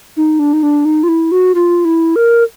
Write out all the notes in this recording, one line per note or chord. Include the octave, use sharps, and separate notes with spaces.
D#4
D4
D#4
D4
D#4
F4
E4
F#4
F4
E4
A#4